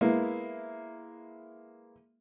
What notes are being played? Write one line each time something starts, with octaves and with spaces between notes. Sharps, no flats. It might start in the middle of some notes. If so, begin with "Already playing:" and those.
G#3 A#3 B3 E4